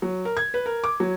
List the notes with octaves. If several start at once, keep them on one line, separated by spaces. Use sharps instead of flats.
F#3
A#4
G#6
B4
A#4
D6
F#3